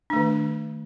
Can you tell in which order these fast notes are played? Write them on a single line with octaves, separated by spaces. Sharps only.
D4 A3 D#3